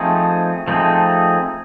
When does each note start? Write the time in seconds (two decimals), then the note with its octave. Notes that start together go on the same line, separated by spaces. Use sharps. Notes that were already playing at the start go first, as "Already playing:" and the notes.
Already playing: F3 A3 C4 D#4 G#4
0.68 F3 A3 C4 D#4 G#4